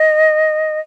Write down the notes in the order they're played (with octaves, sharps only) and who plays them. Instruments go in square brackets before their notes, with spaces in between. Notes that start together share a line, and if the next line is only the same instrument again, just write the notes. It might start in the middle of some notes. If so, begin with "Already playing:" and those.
Already playing: [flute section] D#5